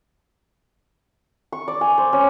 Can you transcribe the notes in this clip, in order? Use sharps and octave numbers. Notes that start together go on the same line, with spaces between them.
C#6
D5
G#5
C5
C#4